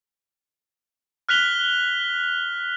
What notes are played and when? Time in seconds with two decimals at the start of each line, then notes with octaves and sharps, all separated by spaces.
1.29 F6 F#6 B6 F7 G7